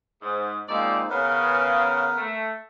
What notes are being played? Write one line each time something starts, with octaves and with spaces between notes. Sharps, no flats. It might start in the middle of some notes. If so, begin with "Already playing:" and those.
G#2
F3 G#3 A#3 C4 D#4 D5
C#3 B3 A#4 B4
A3